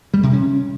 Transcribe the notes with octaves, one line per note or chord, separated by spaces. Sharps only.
G3
C3
C#4